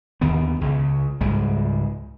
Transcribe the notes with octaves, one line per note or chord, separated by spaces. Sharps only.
D#2 D3 D#3 B3
C#2 C#3
C#2 G#2 G3 G#3